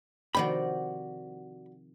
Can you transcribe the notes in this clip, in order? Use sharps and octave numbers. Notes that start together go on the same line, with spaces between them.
C3 D#3 F3 F#4 D5 G5 B5